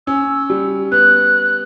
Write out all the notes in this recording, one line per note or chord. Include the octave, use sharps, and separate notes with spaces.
C#4 E6
G3
B3 F#6